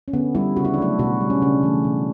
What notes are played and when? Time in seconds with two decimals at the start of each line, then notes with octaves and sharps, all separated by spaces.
0.08 C#4
0.13 D3 B3
0.35 G3 E4
0.56 C#3 F#4
0.65 E4
0.74 D4
0.78 F#3 A3 E4
0.99 B2 F#4
1.21 G3
1.30 C#4
1.42 C#3 D4
1.63 E3 A3
1.84 B2